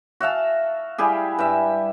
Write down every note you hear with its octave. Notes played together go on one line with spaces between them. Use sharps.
F#4 E5 F5 A5
G3 E4 G4 G#4
G2 E5